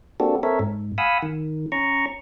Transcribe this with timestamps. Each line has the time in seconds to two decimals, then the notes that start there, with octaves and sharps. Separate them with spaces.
0.20 A#3 C4 D4 F#4 G4 A4
0.43 C4 A4 A#4 C#5 E5
0.59 G#2
0.98 F5 F#5 G#5 B5 D#6 E6
1.22 D#3
1.72 C#4 A#5 C#6